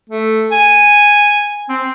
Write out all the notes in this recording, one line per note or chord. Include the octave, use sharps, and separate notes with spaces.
A3
G#5
C4